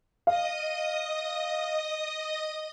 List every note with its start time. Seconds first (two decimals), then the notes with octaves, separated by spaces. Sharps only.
0.27 D#5 F5 D#6